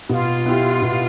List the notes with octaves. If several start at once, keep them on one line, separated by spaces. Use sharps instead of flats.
B2 F4
B3 E4 G4
B2